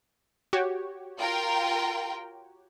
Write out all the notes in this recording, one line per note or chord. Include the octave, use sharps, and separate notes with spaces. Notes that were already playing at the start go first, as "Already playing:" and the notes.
F#4 G4 C#5
F4 A#4 G5